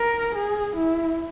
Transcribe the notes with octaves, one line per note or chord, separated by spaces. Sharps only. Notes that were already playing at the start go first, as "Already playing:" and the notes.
Already playing: A#4
G#4
E4